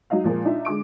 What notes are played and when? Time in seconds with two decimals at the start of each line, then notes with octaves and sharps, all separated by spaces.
0.10 F#3 D#4 D#5 F5
0.24 A#2 F3 G#3 A#3
0.45 D4 D#4 F4 E5
0.65 D3 G#3 D6 D7